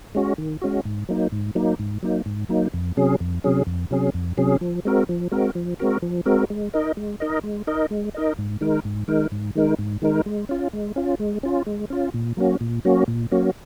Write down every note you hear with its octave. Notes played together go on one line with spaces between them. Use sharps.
G#3 C#4 F#4
D#3
G#3 C#4 F#4
G#2
F#3 A#3 D#4
G#2
F#3 A#3 D#4
G#2
F#3 A#3 D#4
G#2
F#3 A#3 D#4
F2
C3 F#3 C#4 G#4
F2
C3 F#3 C#4 G#4
F2
C3 F#3 C#4 G#4
F2
C3 F#3 C#4 G#4
F3
G#3 C4 F#4 A#4
F3
G#3 C4 F#4 A#4
F3
G#3 C4 F#4 A#4
F3
G#3 C4 F#4 A#4
G#3
D#4 A#4 D#5
G#3
D#4 A#4 D#5
G#3
D#4 A#4 D#5
G#3
D#4 A#4 D#5
G#2
D#3 G#3 D#4 A#4
G#2
D#3 G#3 D#4 A#4
G#2
D#3 G#3 D#4 A#4
G#2
D#3 G#3 D#4 A#4
G#3
C#4 F4
G#3
C#4 F4
G#3
C#4 F4
G#3
C#4 F4
A#2
F#3 A#3 C#4 F#4
A#2
F#3 A#3 C#4 F#4
A#2
F#3 A#3 C#4 F#4